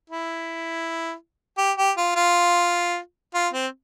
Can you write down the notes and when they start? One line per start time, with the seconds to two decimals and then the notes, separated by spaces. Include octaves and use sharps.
0.10 E4
1.58 G4
1.78 G4
1.97 F4
2.16 F4
3.34 F4
3.53 C4